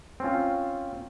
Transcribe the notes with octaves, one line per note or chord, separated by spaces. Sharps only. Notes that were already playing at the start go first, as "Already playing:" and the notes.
C4 C#4 F4